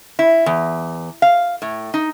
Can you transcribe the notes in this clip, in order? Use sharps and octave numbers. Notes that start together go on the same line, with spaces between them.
E4
E2
F5
A2
D#4